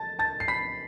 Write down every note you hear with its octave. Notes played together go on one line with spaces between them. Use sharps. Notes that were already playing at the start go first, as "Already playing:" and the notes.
Already playing: A5 A6
A5 A6
C7
B5 B6